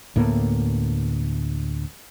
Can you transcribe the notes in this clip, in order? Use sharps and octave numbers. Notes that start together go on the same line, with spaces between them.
D2 A2 A#3 B3